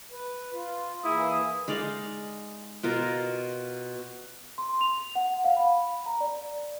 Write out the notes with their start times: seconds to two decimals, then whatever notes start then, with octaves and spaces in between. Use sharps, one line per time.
0.12 B4
0.52 F4
1.05 E3 A#3 E4 G#4 D#6
1.68 G#3 D#4 D5 F5
2.83 B2 F4 A#4
4.58 C6
4.81 F7
5.15 F#5
5.44 F5
5.57 B5
6.06 A#5
6.20 D5